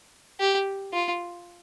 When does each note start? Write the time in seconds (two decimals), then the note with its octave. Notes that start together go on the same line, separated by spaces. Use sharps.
0.40 G4
0.93 F4